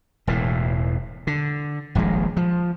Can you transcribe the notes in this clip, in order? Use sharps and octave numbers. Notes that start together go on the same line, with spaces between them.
E1 E2 A2
D3
D#1 A#1 F3 G#3
F3